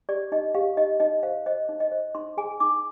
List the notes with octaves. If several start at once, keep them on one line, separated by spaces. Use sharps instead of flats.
G4 D5
D#4 D#5
G4 F5
D#4 D#5
D#4 D#5
C5 F5
C5 D#5
D#4
D#5
C5
D#4 C6
G#4 G#5
D#4 D6